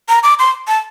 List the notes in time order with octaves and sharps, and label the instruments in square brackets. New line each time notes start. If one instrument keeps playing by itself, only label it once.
[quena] A#5
D6
C6
A5